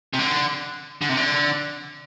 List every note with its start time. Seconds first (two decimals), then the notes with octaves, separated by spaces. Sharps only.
0.13 C3
0.19 D3
1.02 D3
1.09 C3
1.17 D3